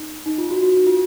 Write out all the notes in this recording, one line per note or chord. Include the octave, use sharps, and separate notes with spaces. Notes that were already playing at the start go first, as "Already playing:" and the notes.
Already playing: D#4
D#4
F4
F#4
F#4
F#4
F4